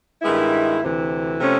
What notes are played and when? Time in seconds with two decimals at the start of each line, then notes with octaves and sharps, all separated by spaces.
0.22 G2 D#3 G#3 B3 E4
0.81 D2 C3 E3
1.40 C3 F3 A3 C#4